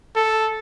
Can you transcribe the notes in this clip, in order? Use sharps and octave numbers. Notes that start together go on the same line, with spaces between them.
A4